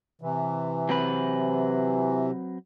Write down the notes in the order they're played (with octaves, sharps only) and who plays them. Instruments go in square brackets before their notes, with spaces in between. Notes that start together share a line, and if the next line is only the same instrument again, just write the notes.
[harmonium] C3 E3
[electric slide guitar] F#3 C4 B4